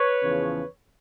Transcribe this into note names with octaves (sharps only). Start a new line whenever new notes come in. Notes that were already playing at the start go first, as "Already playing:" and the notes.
Already playing: B4 C#5
E2 C#3 F3